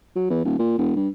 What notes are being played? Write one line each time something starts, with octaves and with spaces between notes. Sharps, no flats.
F#3
E2
D#1
A#2
E1
G2